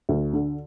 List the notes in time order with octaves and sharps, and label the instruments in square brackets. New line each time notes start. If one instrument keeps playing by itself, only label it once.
[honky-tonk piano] D2
D3